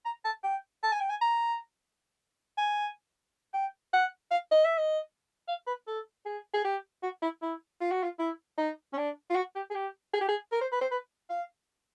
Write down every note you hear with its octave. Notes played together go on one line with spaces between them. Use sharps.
A#5
A5
G5
A5
G#5
G5
G#5
A#5
G#5
G5
F#5
F5
D#5
E5
D#5
F5
B4
A4
G#4
G#4
G4
F#4
E4
E4
F4
F#4
F4
E4
D#4
C#4
D4
F4
F#4
G4
G#4
G4
G#4
G4
G#4
A#4
C5
B4
C5
B4
F5